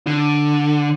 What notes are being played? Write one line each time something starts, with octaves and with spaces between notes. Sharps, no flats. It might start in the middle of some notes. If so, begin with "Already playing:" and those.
D3